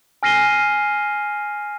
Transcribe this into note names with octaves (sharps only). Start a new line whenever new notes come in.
G#5 F6 A#6 C7 D#7 G7